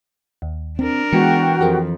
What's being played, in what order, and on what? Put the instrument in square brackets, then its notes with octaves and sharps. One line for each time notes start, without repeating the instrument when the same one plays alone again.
[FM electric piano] D#2
[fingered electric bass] C4 [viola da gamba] D4 A#4
[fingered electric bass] E3 [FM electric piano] G#3 B3 C#7 [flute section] F#4 G5
[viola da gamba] F2 [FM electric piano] G4 G#4 A#4